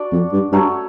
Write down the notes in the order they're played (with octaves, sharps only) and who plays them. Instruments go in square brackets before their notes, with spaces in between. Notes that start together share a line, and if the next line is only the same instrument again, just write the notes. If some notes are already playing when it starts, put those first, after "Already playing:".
Already playing: [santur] D4 F#4 D5
[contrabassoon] F2
G2
[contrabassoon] G2 [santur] F#3 A3 C#4